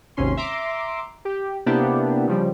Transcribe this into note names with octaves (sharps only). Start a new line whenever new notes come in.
G#1 D#2 C3 C#4 C6
E5 A#5 C6 D6
G4
C3 A#3 B3 D4 E4 G4
C#3 F3 G3